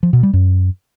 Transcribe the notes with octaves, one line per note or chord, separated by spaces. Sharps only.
F3
B2
G3
F#2